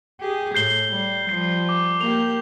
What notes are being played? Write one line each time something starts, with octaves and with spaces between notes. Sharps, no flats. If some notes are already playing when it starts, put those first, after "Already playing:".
G4 G#4
A2 G6 C7 G7
G3
F3 G3 C7
D6
A#3 G4 F7